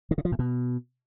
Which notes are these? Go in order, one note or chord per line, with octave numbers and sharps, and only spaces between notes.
D#3
C#3
F3
A2
B2